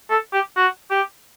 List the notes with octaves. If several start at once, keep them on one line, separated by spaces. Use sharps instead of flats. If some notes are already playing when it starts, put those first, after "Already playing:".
A4
G4
F#4
G4